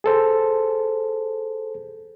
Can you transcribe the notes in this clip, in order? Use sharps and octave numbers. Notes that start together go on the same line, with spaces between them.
G#4 A4 C5